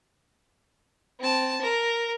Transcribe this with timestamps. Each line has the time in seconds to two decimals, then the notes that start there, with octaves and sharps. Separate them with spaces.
1.19 C4 A5
1.61 A#4